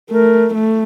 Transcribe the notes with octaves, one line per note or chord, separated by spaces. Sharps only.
A3 A#4
A3